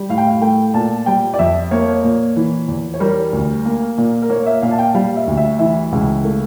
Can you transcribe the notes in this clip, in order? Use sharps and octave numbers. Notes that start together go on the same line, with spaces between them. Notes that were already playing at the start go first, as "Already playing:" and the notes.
Already playing: G3
A2 F5
G5
F5
A3 G5
A#2 A5
G3 G5
D5
F2 E5
A#3 C#5
A#2
E3
E2
C#5
G3 A#4
D2
A#3
A#2
A#4
A#3 C#5
E5
A#2 F5
A5
G5
G3 F5
E5
D2
E5
E3 E5
C#2
A3